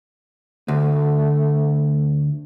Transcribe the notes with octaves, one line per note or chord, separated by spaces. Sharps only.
D2 A3